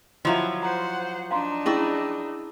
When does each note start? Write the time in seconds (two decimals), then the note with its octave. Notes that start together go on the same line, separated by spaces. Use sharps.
0.25 F3 F#3 E4 F4 D#5 E5
0.63 C5 F#5 A#5
1.31 D4 D#4 F5 A#5 C6
1.66 C#4 E4 G#4 D5 D#5 C#6